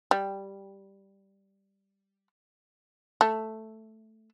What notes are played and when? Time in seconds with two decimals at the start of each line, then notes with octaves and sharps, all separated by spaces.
0.11 G3
3.21 A3